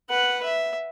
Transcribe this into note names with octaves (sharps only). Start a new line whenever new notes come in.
B4 F#5
E5